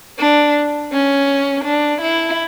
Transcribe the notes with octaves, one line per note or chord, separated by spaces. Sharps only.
D4
C#4
D4
E4